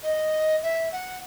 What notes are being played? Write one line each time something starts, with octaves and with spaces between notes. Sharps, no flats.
D#5
E5
F#5